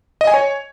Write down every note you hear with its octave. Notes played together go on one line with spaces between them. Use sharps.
D#5
G#5
C#5